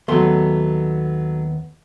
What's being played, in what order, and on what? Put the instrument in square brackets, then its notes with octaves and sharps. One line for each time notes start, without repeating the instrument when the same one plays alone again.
[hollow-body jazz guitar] D#2 B3 C6 [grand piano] F#3 A3